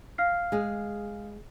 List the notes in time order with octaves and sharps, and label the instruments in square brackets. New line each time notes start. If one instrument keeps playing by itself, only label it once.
[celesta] F5 F6 C7
[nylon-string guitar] G#3 G#4